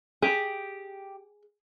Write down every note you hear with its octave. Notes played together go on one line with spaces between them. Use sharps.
G4 G#4